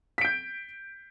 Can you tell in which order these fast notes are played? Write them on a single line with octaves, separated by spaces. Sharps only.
B6 D7 G6